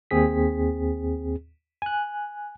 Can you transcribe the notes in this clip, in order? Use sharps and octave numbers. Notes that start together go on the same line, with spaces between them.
D#2 C4 G#4 B6
G#5 F#6